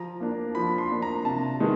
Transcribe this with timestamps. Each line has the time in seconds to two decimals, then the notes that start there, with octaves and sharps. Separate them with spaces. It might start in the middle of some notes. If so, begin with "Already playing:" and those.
Already playing: F3 A#5
0.20 A#3 D4
0.55 F3 B5
0.78 C6
0.90 A#3 D4
1.02 A#5
1.25 C3 A5
1.60 D#3 G#3 B3